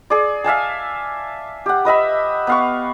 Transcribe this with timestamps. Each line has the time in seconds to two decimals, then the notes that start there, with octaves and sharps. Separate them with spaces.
0.10 G#4 D5
0.44 E5 F5 G#5 A5
1.66 G4 F#5
1.85 B4 D#5 E5 B5
2.47 B3 F5 C#6